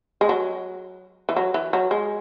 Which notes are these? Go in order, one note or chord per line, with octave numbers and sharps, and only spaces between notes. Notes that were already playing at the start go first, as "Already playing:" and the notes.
G#3
F#3
E3
F#3
E3
F#3
G#3